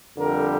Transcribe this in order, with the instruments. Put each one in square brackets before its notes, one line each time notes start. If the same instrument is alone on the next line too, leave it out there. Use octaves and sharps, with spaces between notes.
[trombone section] F2 D3 G3 A#4